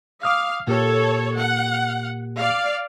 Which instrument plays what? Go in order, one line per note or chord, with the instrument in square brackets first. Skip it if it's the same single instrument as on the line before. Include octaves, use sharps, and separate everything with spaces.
[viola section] F5 [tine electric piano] D6 D#6 F6
[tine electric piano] A#2 A#3 G4 [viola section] A4 C#5
[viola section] F#5
D5 F5